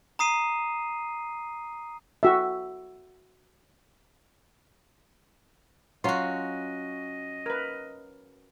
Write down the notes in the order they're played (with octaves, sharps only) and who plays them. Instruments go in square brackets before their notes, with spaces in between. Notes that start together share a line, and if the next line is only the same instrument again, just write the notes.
[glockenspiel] A#5 D#6 C7 D#7
[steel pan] F#4 E5
[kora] F#3 F4 [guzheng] C#4 F#4 [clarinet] D#5 [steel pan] C6
[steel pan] A#4 B4